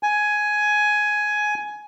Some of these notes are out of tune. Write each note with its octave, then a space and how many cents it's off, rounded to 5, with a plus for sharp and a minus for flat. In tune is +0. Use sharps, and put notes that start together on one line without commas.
G#5 +10